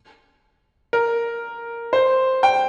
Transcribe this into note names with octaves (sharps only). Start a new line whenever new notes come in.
A#4
C5
G5